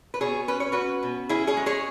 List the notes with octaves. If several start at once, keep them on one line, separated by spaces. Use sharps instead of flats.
B4
B2 G#4 C#5
C#4 B4
C#5
C#4 F#4 B4
B2
C#4 E4 G#4
G#4 C#5
G#3
G#4 C#5